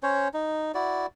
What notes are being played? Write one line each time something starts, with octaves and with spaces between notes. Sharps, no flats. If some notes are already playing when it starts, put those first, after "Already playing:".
C#4 C5 C#5
D#4
E4 F#4 D5